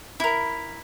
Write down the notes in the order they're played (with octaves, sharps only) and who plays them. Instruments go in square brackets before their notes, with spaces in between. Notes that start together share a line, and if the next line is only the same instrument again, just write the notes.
[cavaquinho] E4 A#4